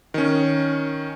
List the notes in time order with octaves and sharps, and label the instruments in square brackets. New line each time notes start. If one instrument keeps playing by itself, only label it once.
[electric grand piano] D#3 C#4